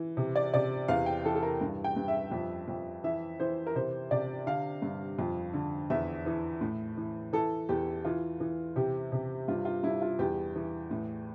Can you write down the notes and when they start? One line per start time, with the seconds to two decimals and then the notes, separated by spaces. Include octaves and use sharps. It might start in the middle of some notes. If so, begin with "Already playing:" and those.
Already playing: E3
0.17 C3
0.36 D5
0.54 C3 D5
0.88 E2 F5
1.06 G5
1.25 E3 A4
1.35 A4
1.43 A#4
1.61 G2
1.84 G5
1.96 G2
2.08 E5
2.31 F2
2.68 F2
3.04 E3 E5
3.40 E3 C5
3.67 A#4
3.75 C3 C5
4.11 C3 D5
4.46 D3 F5
4.82 G2
5.19 F2
5.54 D3
5.90 E2 E5
6.26 E3
6.61 A2
6.97 E3
7.33 E3 A4
7.69 E2 G4
8.05 E3 F4
8.40 E3
8.76 C3 G4
9.12 C3
9.48 G2 F4
9.65 F4
9.83 G2 E4
10.02 F4
10.19 E2 G4
10.56 E3
10.91 A2